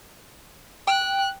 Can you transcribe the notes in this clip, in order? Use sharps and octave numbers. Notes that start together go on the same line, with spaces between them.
G5 F#6